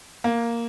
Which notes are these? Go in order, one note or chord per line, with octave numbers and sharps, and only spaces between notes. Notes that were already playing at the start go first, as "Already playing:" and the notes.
A#3